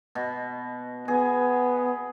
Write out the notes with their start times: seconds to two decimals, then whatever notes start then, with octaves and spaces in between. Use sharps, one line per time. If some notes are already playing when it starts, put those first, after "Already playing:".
0.15 B2
1.08 B3 G#4